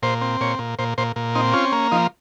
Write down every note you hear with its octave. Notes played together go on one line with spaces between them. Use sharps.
A#2 C5
C4
A#2 C#5
A#2
A#2 C5
A#2 C5
A#2
C4 D#4
C#4 F4
A#3
F3 D#4